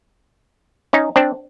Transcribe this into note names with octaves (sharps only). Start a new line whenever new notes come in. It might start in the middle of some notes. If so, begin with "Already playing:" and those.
C#4 D#4
C4 D4